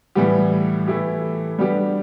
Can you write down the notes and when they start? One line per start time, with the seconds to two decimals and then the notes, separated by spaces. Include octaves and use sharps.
0.15 A2 E3 G3 B3 G4
0.88 E3 A3 E4 G4
1.59 G3 B3 D4 G4